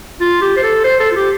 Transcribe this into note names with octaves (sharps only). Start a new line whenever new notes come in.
F4
G4
C5
A4
C5
A4
F4
G4